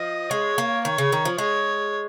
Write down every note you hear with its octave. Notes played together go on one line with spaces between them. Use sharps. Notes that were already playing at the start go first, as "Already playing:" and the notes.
Already playing: F3 D#5
G#3 C#5
A#3
D#3 C#5
C#3
D#3
F3
G#3 C#5